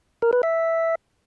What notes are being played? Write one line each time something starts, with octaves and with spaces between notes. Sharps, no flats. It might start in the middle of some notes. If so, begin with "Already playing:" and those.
A#4
B4
E5